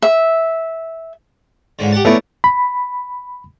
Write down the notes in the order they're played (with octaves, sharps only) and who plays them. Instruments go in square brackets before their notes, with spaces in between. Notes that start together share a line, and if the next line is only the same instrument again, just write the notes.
[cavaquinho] E5
[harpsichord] C#2 G#2 D3
G4 F#5 A5
[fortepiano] A3 B3 E4 [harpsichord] C#4 A#4 D5
[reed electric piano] B5